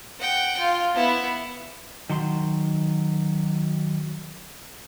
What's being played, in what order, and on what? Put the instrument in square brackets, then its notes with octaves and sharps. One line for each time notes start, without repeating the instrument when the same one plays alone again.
[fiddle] F#5 G5
F4
B3 E4
[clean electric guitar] D#3 F#3 C6